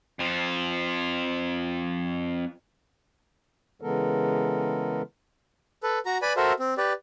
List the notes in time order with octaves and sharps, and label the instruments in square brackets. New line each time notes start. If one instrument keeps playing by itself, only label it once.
[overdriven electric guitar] F2 F3
[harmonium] C#3 E3 G#3 B3 A4 A#4
[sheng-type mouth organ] A4 B4
F#4 A#5
B4 D5 G#5 B5
F#4 A4 A#4 C5 E5
C4
G4 B4 D5